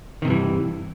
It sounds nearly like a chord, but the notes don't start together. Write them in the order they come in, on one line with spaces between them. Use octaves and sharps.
D#3 C3 G2 E3